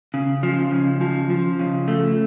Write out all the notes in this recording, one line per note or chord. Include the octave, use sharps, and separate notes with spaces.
C#3
F3
C#3
F3
F3
C#3
A3